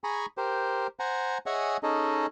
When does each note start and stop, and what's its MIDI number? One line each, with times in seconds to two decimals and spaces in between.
0.04 0.26 68
0.04 0.26 80
0.04 0.26 82
0.04 0.26 83
0.04 0.26 85
0.38 0.87 67
0.38 0.87 70
0.38 0.87 72
1.00 1.38 72
1.00 1.38 78
1.00 1.38 80
1.00 1.38 82
1.46 1.77 68
1.46 1.77 73
1.46 1.77 75
1.46 1.77 76
1.46 1.77 78
1.46 1.77 80
1.83 2.26 61
1.83 2.26 63
1.83 2.26 68
1.83 2.26 69
1.83 2.26 75